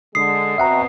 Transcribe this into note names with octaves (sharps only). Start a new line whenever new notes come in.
D3 G#3 D#6 C7
B2 C4 E5 F#5 A#5